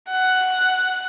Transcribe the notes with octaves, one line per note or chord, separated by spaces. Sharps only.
F#5